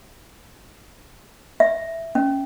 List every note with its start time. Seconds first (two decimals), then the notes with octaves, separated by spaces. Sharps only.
1.60 E5
2.15 C#4